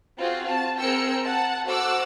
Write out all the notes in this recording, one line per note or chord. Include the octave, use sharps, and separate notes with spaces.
C4 F4 F#4 G#4
A5
C4 G#4 A#4 G5 E6 C#7
F#5 A5
F#4 A4 C5 F#5 D6 E6